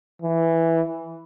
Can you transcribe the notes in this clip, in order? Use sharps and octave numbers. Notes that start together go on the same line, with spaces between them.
E3